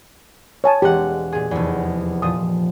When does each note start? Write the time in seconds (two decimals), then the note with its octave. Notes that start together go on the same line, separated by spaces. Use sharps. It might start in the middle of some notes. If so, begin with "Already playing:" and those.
0.64 C#5 G#5 A5
0.82 E1 G#3 G4 F#5
1.32 A#2 G#4
1.51 F1 E2
2.22 A#2 F3 D#6